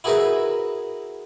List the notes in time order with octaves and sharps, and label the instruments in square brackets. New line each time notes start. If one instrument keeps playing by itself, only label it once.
[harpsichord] E4 F#4 G#4 A#4 B4 E5